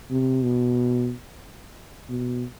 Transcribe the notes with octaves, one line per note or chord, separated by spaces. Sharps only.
C3
B2
B2